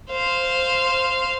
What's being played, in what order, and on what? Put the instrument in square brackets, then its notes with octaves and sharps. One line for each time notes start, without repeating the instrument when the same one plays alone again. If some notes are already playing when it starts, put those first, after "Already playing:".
[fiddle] C5 F5